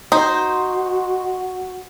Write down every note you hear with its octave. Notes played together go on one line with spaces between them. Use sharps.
D#4 F#4 C5